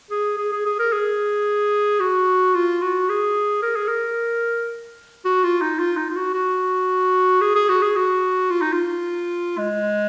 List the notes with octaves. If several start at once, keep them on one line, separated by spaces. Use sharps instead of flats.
G#4
G#4
G#4
G#4
A#4
G#4
F#4
F4
F#4
G#4
A#4
G#4
A#4
F#4
F4
D#4
F4
D#4
F4
F#4
F#4
G#4
G#4
F#4
G#4
F#4
F4
D#4
F4
G#3